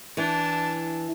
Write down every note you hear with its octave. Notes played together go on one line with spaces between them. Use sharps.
E3 D4 A5